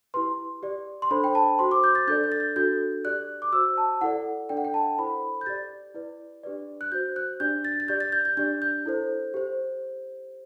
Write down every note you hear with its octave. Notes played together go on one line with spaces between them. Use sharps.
E4 G4 B4 C6
G4 D5
C6
D4 A4 C5 B5
G5
A5
F#4 C5 C6
D6
G6
A6
D4 A4 D5 G6
G6
A6
G6
D4 F#4 A4 G6
G4 D5 F#6
D6
F#4 C5 E6
A5
E4 A4 D5 F#5
D4 A4 D5 G5
F#5
G5
A5
E4 A4 C5 B5
G6
G4 D5 A6
E4 B4 D5
D4 G4 B4 D5
F#6
F#4 C5 G6
F#6
D4 G4 D5 G6
A6
A6
G4 D5 G6
A6
G6
G6
D4 G4 D5 G6
G6
E4 A4 C5
G4 C5